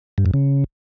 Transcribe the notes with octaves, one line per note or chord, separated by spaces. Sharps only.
G2
F#2
C#3